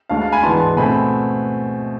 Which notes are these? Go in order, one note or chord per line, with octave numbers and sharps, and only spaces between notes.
D2 D3 G#3 F5 A5
F5 A5
G#5 B5
G#2 E3 B3 D4 A5 C6
A5 C6
B2 A3 C4 G#5 B5